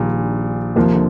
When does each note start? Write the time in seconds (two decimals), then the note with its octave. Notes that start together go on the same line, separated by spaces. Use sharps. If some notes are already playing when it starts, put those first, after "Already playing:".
Already playing: A#1 A#2 D#3 G3 D4
0.76 D#2 C3 D#3 F3 A#3
0.93 D3